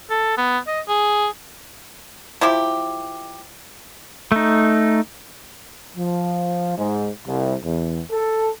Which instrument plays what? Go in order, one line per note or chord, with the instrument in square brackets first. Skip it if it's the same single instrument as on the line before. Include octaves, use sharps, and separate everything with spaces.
[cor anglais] A4
B3
D#5
G#4
[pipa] F3 E4 G4
[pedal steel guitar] A3 D#4
[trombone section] F3
G#2
C2
E2
A4